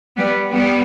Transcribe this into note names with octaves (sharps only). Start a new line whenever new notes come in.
G3 B3
G3 B3